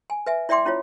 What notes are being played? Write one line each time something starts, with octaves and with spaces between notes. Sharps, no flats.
G#5
B4 E5 G#5
E4 D5 E5 G5 C6 D6
C#4 E4 F4 C#5